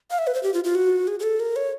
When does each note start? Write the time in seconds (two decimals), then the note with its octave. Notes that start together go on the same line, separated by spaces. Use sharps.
0.10 F5
0.18 E5
0.27 B4
0.34 C5
0.43 G4
0.54 F4
0.64 F4
0.75 F#4
1.07 G#4
1.20 G#4
1.23 A4
1.40 A#4
1.56 C#5